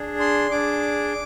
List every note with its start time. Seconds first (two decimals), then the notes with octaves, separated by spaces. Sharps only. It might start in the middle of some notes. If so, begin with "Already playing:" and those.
Already playing: D4 G#4
0.20 C6
0.51 D4 G#4 D6